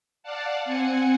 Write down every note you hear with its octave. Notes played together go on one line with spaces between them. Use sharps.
D5 F5 F#5 A5
C4 F#5 G#5 C#7